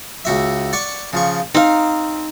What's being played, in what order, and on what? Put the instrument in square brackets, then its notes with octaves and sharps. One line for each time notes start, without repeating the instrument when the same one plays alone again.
[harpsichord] C#2 F#4 E5
D5 F#5 C#6
C#3 F3 C#6
[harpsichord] C4 [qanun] D#4 F5